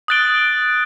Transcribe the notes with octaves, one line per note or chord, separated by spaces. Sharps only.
D#6 F#6 A6 D7 G7